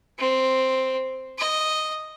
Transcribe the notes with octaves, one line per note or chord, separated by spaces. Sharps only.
C4
D#5